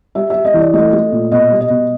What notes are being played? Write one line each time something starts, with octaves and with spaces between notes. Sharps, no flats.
G3 E5
G3 E5
D#5
E3 D5
A3 D#5
A3
A#2
B2 D#5
G3
D#5
B2